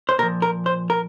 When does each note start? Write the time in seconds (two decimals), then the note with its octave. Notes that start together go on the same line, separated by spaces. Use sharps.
0.09 C5
0.18 A#2 A#4
0.23 F3
0.42 A#4
0.66 C5
0.90 A#4